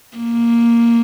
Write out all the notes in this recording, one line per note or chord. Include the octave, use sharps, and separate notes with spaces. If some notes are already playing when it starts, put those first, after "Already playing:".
A#3